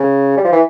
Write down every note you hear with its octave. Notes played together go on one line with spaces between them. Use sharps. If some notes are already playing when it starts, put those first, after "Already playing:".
Already playing: C#3
G3
F3
E3